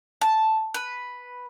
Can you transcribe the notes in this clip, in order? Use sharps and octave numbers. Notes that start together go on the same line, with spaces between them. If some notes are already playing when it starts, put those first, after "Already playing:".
A5
B4